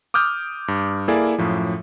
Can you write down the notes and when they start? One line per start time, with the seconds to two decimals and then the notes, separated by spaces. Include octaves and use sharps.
0.14 D6 D#6 F6 G6
0.68 G2
1.08 A#3 E4 G#4 A4 D5 G#5
1.38 F#2 A2 F3